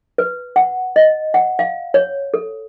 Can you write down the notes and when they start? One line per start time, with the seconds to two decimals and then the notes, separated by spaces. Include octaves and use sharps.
0.18 B4
0.56 F#5
0.96 D#5
1.34 F#5
1.59 F5
1.94 C#5
2.34 A4